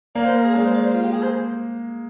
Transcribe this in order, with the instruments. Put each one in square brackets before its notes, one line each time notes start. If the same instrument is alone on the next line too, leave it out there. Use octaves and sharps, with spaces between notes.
[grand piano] A#3 [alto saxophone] D5
[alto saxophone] C5
A#4
G#4
[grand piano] G#3 [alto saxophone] D5
[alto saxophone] C5
D5
C5
F4
G4
G#4
C5